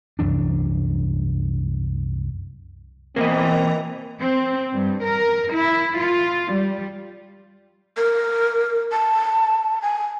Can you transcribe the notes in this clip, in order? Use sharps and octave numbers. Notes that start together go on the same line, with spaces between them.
C2 F#2 E3 D4
B2 E3 A#3 C4 A#4 D#5
C4
G2
A#4
E4
F4
G3
A#4
A5
G#5